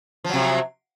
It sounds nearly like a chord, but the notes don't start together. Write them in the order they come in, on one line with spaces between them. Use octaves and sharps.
F3 F#3 C3